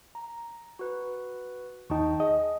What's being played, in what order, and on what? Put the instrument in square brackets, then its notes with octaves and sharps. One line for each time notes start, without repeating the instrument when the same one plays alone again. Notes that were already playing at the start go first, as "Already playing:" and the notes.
[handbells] A#5
F#4 B4
[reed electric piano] D#2 D#4 [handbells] G5 A5 C#6
[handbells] G#4 [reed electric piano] D#5